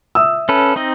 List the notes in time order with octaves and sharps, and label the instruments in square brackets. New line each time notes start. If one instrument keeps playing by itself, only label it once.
[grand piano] E5 D#6 E6
[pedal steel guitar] C#4 A4 B4
C4 D#4 D#5